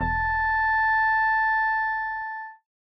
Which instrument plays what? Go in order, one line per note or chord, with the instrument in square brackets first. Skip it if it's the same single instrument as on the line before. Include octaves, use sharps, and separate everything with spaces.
[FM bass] E1 [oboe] A5